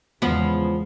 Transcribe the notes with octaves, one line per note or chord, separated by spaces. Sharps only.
E2 C#3 F3 G#3 B3